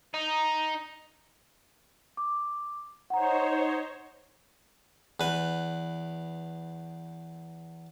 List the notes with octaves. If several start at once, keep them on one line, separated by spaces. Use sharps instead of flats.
D#4
D6
D#4 C5 C#5 F#5 A#5
E2 B4